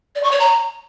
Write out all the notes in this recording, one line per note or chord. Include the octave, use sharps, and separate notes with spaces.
D5
C#6
C#5
A#5